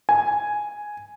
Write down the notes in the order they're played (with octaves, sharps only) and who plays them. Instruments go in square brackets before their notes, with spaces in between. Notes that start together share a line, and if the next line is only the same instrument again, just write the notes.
[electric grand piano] G#5